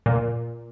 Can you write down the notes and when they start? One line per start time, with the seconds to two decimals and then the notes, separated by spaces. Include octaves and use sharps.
0.06 A#2